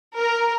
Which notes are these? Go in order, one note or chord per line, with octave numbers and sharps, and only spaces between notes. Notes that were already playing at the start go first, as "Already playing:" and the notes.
A#4